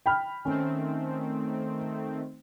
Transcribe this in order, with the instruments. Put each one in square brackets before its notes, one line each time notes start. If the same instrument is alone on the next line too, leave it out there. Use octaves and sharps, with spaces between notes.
[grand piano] G5 B5 F6
[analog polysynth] D#3 A3 C4 [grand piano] C#4